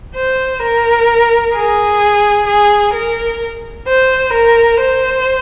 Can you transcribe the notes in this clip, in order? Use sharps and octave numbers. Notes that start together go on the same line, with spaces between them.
C5
A#4
G#4
G#4
A#4
C5
A#4
C5